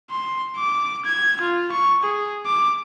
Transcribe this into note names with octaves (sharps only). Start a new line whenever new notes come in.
C6
D6
G#6
F4
C#6
G#4
D6